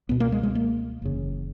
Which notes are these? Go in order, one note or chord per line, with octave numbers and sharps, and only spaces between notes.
C#2 B2 B3
A#3
G#3
G#3
A#3
F#1 E2 C#3